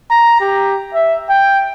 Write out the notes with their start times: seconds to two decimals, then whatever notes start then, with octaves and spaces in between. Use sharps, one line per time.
0.10 A#5
0.41 G4
0.94 E5
1.30 G5